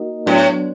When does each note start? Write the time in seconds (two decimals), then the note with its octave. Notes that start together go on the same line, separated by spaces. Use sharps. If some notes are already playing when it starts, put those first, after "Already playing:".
Already playing: A#3 D#4 F#4 A#4 D#5
0.26 A2 F#3 B3 D4